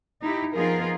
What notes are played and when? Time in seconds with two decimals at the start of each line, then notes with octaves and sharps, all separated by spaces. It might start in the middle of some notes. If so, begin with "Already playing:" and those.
0.21 D#4 E4 G4
0.54 F3 B3 D#4 F4 G#4 A#4